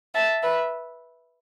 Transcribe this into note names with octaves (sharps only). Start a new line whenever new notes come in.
E5 A5
B4 E5